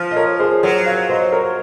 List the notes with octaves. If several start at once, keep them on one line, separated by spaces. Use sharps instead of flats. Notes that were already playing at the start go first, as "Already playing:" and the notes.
Already playing: F3
D#5
A#4 C#5
G#4 C5
F#3 A#4 C#5
C#5 F5
C5 D#5
A#4 C#5